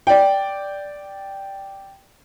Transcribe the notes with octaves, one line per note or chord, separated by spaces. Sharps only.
D5 G5